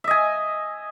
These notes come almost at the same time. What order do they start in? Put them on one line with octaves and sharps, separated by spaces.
E5 D#5 G#5